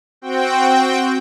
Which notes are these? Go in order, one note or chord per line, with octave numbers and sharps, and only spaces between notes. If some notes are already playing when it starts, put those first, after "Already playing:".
C4 F#4 G5